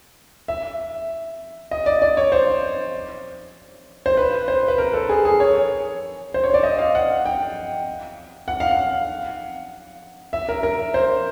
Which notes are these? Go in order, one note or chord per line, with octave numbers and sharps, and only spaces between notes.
E5
D#5
D5
D5
C#5
C5
C5
B4
C5
B4
A#4
A4
G#4
G#4
C#5
C5
C#5
D5
D#5
F5
F#5
G5
F#5
F5
F#5
E5
A#4
A#4
C5